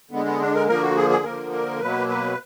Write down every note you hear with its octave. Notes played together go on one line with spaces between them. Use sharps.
D3 G#3 B3
B3
D4
A#4
D3 F3 A#3 A#4
F#4
G#4
G#4
D3 F3 A#3 A#4
A#4
B2 F#3 A#3 B4
B4